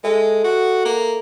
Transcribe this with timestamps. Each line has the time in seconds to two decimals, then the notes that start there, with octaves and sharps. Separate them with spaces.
0.04 G#3 A4 E5
0.44 F#4
0.85 A#3